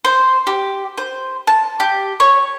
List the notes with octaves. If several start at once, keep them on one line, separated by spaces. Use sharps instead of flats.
C5
G4
C5
A5
G4
C#5